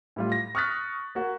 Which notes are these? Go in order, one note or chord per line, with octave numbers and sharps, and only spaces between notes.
A2 G3 F4
A#6
C#6 D#6 F6 F#6 A6 B6
A#3 F#4